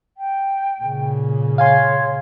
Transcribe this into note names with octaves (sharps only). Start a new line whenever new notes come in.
G5
A#2 C#3
C#5 F5 G#5 C6